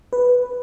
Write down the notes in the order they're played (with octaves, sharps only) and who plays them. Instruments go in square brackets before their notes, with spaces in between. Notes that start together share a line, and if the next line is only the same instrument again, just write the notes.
[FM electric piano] B4